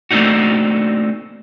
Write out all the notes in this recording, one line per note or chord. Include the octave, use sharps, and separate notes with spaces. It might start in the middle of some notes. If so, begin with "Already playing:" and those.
A3 A#3 C4 D4 D#4 F#4